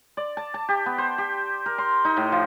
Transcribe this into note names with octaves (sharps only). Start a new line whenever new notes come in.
D5
A5
A5
G4
B3
C5
G4
A#4
C6
D#4
A2
F3